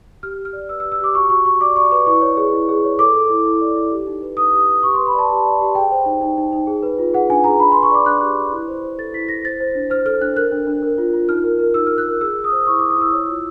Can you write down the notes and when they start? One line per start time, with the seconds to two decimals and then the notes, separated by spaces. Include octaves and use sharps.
0.23 G4 F6
0.39 G4
0.45 F6
0.53 D5
0.69 B4 E6
0.80 E6
0.85 G4
0.92 E6
1.00 G4 D6
1.15 F#4 C#6
1.30 F#4 C#6
1.46 F#4 C#6
1.61 D5 D6
1.76 D5 C#6
1.92 B4 C#6
2.07 E4 C#6
2.22 C#5
2.37 G#4
2.53 E4
2.69 G#4
2.84 C#5
2.99 A4 D6
3.15 A4
3.30 E4
3.45 E4
3.61 D5
3.76 E4
3.92 G4
4.07 D#4
4.22 B4
4.37 D#4 D#6
4.53 G4
4.68 B4
4.83 G4 C#6
4.94 C6
4.99 B4
5.07 B5
5.14 D5 A5
5.30 G4
5.45 D5
5.61 G4
5.75 G#4 G5
5.91 C5
6.06 D#4
6.21 D#4
6.38 D#4
6.52 D#4
6.67 G#4
6.83 B4
6.98 F4
7.14 G#4 F#5
7.30 D4 G#5
7.44 G#4 A#5
7.60 D4 B5
7.72 C6
7.75 B4
7.83 C#6
7.91 D5 D6
8.06 D4 F#6
8.22 G4
8.37 B4
8.52 E4
8.68 C5
8.83 C5
8.98 A4 A6
9.13 E4 B6
9.29 E4 A#6
9.45 C5 A6
9.60 C5
9.75 D4
9.90 C5 F6
10.05 A4 F6
10.21 D4 F#6
10.36 A#4 F#6
10.52 D4
10.67 D4
10.82 A#4
10.98 F4
11.14 F4
11.29 D#4 F6
11.44 A#4
11.59 A#4
11.74 D#4 E6
11.87 F6
11.91 A#4
11.98 F#6
12.06 A#4
12.21 G#4 E6
12.36 G#4
12.44 D#6
12.52 C5
12.67 E4 C#6
12.79 D6
12.82 E4
12.90 D#6
12.98 E4 E6
13.13 C#5
13.28 F4